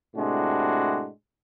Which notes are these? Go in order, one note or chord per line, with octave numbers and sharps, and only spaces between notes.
A2 C3 G#3 D4 F#4